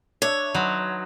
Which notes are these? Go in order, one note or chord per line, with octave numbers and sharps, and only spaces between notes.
D4 C#5 E5
F#3 D#4 B4 C6